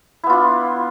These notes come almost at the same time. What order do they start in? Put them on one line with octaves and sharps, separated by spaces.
E4 B3 F4 D4